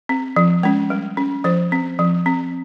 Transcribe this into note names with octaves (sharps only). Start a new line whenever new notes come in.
C4
F3
G#3 C#4
G3
C#4
F3 C5
C4
F3
C4